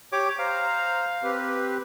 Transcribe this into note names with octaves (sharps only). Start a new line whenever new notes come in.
G4 C#5 D6
C5 F5 A#5
C4 G4 B4